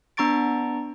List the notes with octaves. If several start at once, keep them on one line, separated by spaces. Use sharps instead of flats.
B3 D4 A#5 C#6 A6 D7